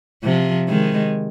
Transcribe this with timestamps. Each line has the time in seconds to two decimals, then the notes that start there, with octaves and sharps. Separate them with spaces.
0.24 C3 F3
0.68 D#3 G#3